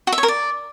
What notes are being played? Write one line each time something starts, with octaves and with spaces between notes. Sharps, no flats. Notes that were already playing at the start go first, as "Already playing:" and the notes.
F#4
E5
C#5
A#4
D5